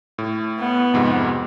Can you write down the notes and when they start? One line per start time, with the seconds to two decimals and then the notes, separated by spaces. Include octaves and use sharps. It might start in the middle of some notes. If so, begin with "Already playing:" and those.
0.18 A2
0.59 B3
0.94 F2 G#2 C3